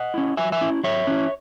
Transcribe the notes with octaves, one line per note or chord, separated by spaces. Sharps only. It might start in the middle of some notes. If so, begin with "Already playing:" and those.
Already playing: D#5 F#5
C#4 E4
F#3 E5 G#5
E5 G#5
C#4 E4
F#3 C#5 E5
C#4 E4